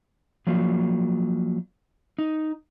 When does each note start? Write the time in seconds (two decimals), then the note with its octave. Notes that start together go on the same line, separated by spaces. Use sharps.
0.47 F3 F#3 A#3
2.19 D#4